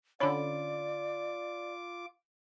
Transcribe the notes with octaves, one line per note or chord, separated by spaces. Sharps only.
D3 C#4 F4 C#5 D5 B5 D6